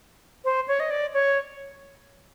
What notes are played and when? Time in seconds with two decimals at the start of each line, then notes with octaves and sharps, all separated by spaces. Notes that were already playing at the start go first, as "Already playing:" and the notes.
0.44 C5
0.68 C#5
0.80 D#5
0.90 D5
1.14 C#5